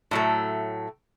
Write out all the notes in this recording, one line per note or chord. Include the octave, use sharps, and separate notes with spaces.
A2 F#3 A3